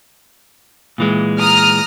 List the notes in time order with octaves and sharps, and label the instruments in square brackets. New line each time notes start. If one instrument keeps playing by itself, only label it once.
[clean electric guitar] A#2 E3 G#3
[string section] A#5 D#6 F6